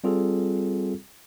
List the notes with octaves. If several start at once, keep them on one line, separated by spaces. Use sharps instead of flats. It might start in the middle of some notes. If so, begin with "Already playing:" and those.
G3 C4 F4 G#4 A4